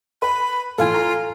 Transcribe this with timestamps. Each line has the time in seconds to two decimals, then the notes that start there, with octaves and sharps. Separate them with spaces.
0.22 B4 B5
0.78 A2 E3 F4 A4 F5 G#5
0.94 A#5